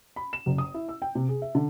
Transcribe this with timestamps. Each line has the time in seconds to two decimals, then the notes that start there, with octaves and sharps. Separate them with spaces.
0.16 B5
0.33 E7
0.46 F#1
0.58 D#6
0.74 E4
0.89 E6
1.02 G5
1.15 C3
1.29 G#4
1.42 E5
1.55 D3